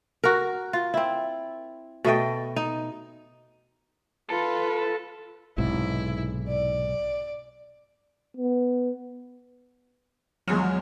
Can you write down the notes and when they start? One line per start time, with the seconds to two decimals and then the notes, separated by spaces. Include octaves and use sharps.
0.24 F#4 A#4
0.73 F4
0.94 C4 E4
2.04 B2 A3 D#5 G5
2.56 D#4
4.30 F4 A4 B4
5.58 B1 G#2 C3 E4
6.48 D5
8.37 B3
10.48 E2 F3 F#3 G#3 G#4 F6